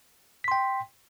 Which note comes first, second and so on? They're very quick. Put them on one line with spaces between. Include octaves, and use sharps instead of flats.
B6 C6 G5